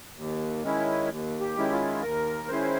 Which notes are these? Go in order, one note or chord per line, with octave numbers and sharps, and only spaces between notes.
D#2
D#3 G#3 C#4 E4
D#2
G4
D#3 G#3 C#4 E4
F4
D#2 A#4
D#3 G#3 C#4 E4 C5